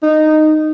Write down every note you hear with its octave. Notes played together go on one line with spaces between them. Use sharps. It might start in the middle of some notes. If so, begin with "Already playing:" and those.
D#4